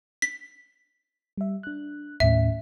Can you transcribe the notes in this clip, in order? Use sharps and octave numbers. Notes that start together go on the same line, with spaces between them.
B6
G3 E5
D4 F#6
D#2 A2 C#4 E5